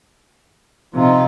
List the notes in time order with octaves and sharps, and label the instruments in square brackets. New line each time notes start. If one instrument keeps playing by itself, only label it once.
[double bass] C3 [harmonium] F3 D#4 F4